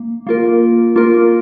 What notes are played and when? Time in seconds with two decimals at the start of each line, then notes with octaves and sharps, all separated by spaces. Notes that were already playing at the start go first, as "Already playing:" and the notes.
Already playing: A#3
0.27 A#3 F4 A#4
0.96 A#3 F4 A#4